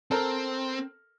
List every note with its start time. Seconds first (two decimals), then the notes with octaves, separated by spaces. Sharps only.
0.11 C4 A4 A#4 F6